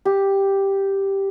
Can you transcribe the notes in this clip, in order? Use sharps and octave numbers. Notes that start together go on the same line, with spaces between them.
G4